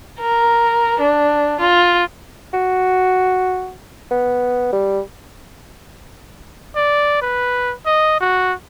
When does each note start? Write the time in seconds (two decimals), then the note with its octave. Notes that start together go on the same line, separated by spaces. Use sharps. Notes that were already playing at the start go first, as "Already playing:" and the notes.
0.19 A#4
1.00 D4
1.60 F4
2.54 F#4
4.11 B3
4.73 G3
6.76 D5
7.21 B4
7.86 D#5
8.20 F#4